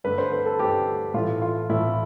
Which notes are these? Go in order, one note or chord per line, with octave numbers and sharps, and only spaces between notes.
G2 D3 A3 B4
C5
B4
A4
G2 D3 A3 G4
A2 E3 A3 F4
F4
A2 E3 A3 E4